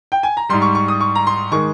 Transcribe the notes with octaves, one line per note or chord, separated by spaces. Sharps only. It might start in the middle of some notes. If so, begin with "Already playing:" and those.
G5
G#5
A#5
G#2 G3 C6
C#6
C#6
D#6
C#6
A#5
C6
D#3 G#3 C#6